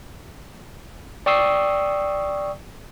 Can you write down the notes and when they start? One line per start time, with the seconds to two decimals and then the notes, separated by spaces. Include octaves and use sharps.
1.26 D5 G5 C#6 D#6 E6 C7